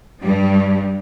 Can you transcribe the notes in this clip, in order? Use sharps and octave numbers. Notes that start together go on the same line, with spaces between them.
G2 G3